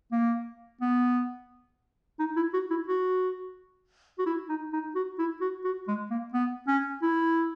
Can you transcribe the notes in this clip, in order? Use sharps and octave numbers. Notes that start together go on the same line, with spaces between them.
A#3
B3
D#4
E4
F#4
E4
F#4
F#4
E4
D#4
D#4
F#4
E4
F#4
F#4
G#3
A#3
B3
C#4
E4